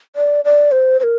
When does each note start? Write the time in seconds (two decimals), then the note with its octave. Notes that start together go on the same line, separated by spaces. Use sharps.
0.16 D5
0.45 D5
0.72 C5
1.00 C5
1.03 A#4